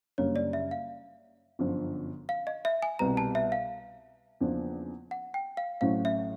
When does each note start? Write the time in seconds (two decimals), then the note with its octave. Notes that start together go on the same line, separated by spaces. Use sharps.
0.18 F#1 F#2 D3 G3 A#3 C#5
0.36 D5
0.53 E5
0.71 F5
1.59 G1 F#2 D3 F3
2.29 F5
2.47 D#5
2.65 E5
2.82 G#5
2.99 C2 B2 G3 B3 A#5
3.17 A5
3.35 E5
3.52 F5
4.41 E2 C#3 F3 A#3 D4
5.11 F#5
5.34 G5
5.57 F5
5.81 A1 A2 F#3 A3 C4 F5
6.05 E5